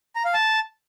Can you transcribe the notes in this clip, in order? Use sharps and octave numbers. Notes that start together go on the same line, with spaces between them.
A#5
F5
A5